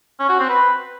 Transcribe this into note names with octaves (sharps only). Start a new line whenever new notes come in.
C#4
F#4
C4
B4